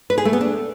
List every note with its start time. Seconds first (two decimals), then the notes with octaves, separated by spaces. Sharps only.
0.10 B4
0.18 G#4
0.25 A3
0.33 B3
0.41 D4